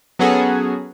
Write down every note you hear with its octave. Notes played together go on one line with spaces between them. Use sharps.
F#3 B3 C#4 F#4 G#4 A4